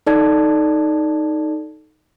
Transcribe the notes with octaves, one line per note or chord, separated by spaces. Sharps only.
D#4 A4 D5 A5 G#6